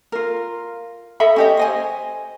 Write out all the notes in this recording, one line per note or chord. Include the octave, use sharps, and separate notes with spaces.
F4 A#4
A4 D#5 E5 B5
C#4 G4 D#5
C5 D#5 G#5